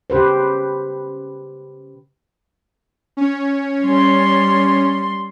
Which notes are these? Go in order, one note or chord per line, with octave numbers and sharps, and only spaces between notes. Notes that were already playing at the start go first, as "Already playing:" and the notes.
C#3 G4 B4 C5
C#4 C#5
G3 C6